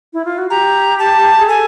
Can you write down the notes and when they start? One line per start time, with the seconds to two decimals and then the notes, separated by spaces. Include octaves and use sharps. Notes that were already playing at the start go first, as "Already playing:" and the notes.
0.13 E4
0.25 F4
0.38 F#4
0.50 G4 A#5
0.99 A5
1.40 G#4
1.48 A4 G#5